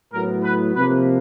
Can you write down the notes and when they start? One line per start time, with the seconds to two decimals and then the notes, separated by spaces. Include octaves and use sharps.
0.13 A2 F#3 B3 A#4
0.44 B4
0.75 C3 F3 A#3 B4